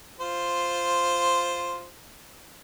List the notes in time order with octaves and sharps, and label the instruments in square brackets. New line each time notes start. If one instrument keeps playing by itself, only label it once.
[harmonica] F4 C5